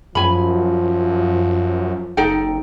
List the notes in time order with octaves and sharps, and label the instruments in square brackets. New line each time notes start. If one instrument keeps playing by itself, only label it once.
[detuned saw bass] F#2 [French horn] F3 [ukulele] G#5 B5
[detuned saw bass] F#1 [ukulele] D#4 A4 G5